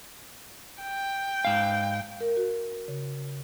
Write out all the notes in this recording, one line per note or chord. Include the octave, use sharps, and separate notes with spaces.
G5
G#2 F5
A#4
F#4
C#3